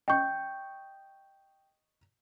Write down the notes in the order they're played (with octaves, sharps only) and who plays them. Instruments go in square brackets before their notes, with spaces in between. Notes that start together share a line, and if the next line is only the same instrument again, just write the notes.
[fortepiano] D#5 C#6 [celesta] G5 G6